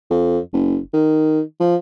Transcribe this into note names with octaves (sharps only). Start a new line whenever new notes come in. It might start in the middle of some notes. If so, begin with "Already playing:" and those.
F2
F#1
D#3
F3